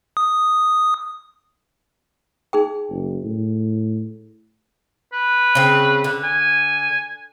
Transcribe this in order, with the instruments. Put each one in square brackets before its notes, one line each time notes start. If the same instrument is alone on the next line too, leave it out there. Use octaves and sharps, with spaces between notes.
[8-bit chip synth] D#6
[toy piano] D#4 G#4 G5
[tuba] F#1
A2
[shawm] B4
[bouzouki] C#3 C4
D3
[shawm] G#5